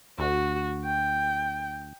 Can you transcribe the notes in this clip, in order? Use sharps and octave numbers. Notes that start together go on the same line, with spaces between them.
D2 F#4
G5